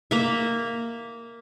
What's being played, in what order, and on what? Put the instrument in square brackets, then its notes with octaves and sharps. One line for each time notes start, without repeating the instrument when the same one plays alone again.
[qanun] A#3 E5